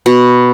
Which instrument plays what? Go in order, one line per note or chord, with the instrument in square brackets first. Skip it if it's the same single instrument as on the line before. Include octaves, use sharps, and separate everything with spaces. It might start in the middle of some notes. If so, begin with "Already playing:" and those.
[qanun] B2